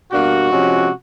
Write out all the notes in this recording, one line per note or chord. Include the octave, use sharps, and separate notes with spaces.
B2 G3 A#3 D4 F#4
C3 F3 G#3 C#4